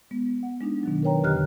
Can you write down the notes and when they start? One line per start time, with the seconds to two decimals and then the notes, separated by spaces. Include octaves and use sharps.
0.11 G#3 B3
0.43 F#5
0.60 G#3 D4 D#4
0.83 B2 D#3 F#3
1.03 A#4 B4 C#5 G5 A#5
1.24 F2 D3 G4 D#5 F6 F#6